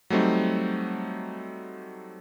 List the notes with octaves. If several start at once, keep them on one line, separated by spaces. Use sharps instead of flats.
F#3 G3 A3 C4 D#4